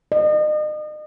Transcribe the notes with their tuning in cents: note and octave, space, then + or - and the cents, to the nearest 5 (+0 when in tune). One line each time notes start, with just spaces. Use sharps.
D#5 -40